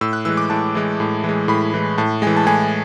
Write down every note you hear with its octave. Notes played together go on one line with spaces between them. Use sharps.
A2 E6
F#6
E3 G#3 E6
D6
A2 A5
E3 G#3
A2
E3 G#3
A2 B5
E3 G#3
A2 A5
E3 G#3 G#5
A5
A2 G#5